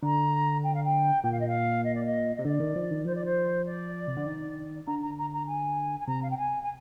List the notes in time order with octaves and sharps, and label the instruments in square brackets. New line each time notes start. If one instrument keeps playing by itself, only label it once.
[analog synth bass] D3 [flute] A#5
[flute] G5
F5
G5
[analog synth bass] A#2 [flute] G5
[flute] F5
D#5
F5
D#5
D5
D#5
[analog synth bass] C3 [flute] D#5
[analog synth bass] D3 [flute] D5
[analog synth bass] D#3
F3
D#3
[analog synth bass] F3 [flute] C5
[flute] D5
C5
D5
[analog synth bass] C3
D3
D#3
[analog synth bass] D3 [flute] A#5
[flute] A#5
A#5
A#5
G#5
G#5
[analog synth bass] C3 [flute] A#5
[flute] F5
G5
G#5
G#5